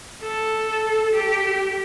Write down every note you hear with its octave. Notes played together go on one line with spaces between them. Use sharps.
A4
G4